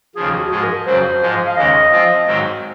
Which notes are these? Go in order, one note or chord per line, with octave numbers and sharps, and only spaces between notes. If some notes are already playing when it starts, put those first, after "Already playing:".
D#2 C#3 F3 G#4
G#4
F#4
G#2 F3 G#3 G#4
A#4
F2 C#3 F#3 C5
G#2 F3 G#3
F5
D#2 C#3 G#3 C#4 D#5
F3 C4 F4
G#2 D#3 F#3 C4 D#4